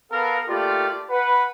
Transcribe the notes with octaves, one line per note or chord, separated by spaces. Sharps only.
B3 A4 A#4 F5
A3 A#3 F4 G4 D5
B4 F#5